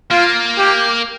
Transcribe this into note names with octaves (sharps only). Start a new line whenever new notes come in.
A#3 F4
G4